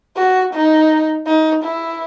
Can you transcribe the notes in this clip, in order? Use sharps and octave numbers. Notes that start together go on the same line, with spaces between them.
F#4
D#4
D#4
E4